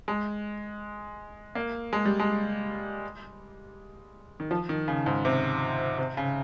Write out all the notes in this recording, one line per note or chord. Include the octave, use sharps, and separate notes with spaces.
G#3
A#3
G#3
G3
G#3
D#3
F3
D#3
C#3
G#2
C3
C3
C#3